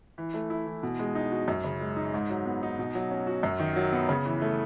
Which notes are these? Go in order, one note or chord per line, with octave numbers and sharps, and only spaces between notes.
E3
A3
E4
E3
B2
G#3
D#4
F#4
F#2
C#3
G#3
D#4
G#2
F#3
B3
D#4
B2
F#3
C#4
F#4
F#2
D#3
F#3
B3
C#3
E3
A3